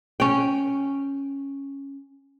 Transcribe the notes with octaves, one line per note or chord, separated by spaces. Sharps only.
C#4 G5